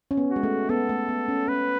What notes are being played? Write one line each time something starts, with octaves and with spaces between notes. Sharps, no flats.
C#4
B3
F#4
G#3
A3
B3 A4
A3
B3
C#4
C#4 B4